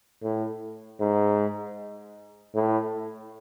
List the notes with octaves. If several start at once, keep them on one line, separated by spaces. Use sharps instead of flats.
A2
G#2
A2